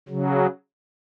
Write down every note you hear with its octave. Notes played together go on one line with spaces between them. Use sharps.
C#3 F#3